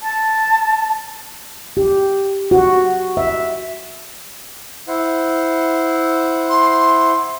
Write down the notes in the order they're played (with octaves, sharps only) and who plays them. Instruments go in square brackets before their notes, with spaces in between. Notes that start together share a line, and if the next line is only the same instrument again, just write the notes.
[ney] A5
[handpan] G4
F#4
E5
[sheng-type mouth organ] E4 C5 F#5
[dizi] C6